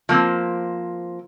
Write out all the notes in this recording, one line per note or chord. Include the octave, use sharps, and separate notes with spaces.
F3 A#3 C4